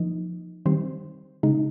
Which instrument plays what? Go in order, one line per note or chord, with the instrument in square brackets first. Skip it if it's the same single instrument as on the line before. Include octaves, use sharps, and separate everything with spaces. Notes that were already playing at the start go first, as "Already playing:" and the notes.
Already playing: [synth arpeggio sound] F3 A#3 D#4
D#3 G3 C4 C5
C#3 G#3 D#4